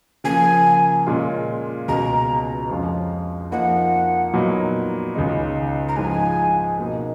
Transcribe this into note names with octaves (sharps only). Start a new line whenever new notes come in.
C#3 F3 A#3 G#5
A#2 G#3 C#4 F4
C#2 B2 G#3 A#5
F2 F3 G#3 C#4 F4
F2 F3 A#3 D#4 F#5
A#2 F#3 B3 D#4
C#2 C#3 G#3 D#4
A#5
G#2 F3 G#3 G#5
B2 A#3 D#4